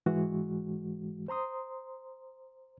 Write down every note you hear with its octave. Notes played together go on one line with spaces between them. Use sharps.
G#2 E3 G#3 F#4
C5 A#5 C6 D#6